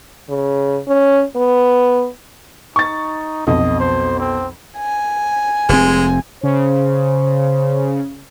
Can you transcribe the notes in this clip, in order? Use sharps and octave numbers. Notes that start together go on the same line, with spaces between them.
C#3
C#4
B3
D#4 C#6 A6
B1 F2 B2 D#5
C5
C4
G#5
F1 G#3 C4
C#3 C5